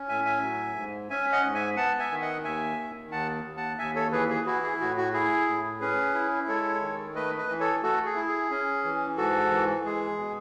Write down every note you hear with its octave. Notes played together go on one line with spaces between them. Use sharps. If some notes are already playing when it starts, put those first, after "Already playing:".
Already playing: C#4
A2 E5 G#5
E5 G#5
F#3
G#2
C#4 E5 G#5
D#5 F#5
G#2
E5 G#5
B3 F#5 A5
E5 G#5
D#3
D#5 F#5
D#2 E5 G#5
D#3
D#2 F#5 A5
D#2
F#5 A5
D#2 E5 G#5
A4 C#5
E3 G#4 B4
G#4
E4 F#4
G#4
A2 F#4
F#4
E4 G#4
A2
C#4 G#4 B4
E4
G#3 A4 C#5
D#3
A3 B4 D#5
B4 D#5
E3
A4 C#5
A3 F#4 A4
G#4
E4
G#4
C#4
E3
G#2 F#4 A4
E3
G#3 G#4
B2